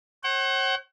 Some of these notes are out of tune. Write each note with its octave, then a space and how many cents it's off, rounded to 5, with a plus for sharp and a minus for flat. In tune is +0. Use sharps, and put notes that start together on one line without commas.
C#5 -45 F#5 +40